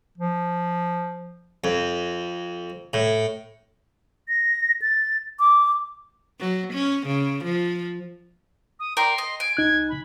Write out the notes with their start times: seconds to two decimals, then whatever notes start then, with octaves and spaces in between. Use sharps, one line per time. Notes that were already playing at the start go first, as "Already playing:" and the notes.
0.18 F3
1.64 F2
2.93 A2
4.29 A#6
4.82 A6
5.40 D6
6.40 F#3
6.73 C#4
7.07 C#3
7.44 F3
8.80 D#6
8.97 A#4 D5 G5 C6
9.18 D#5
9.40 G#5 D7
9.57 C2 D#4 F#6 G#6
9.89 B5